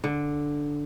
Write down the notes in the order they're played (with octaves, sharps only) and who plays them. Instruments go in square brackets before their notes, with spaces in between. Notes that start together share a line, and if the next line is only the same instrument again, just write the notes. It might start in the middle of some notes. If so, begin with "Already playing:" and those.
[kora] D3